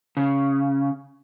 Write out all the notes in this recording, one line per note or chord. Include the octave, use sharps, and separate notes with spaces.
C#3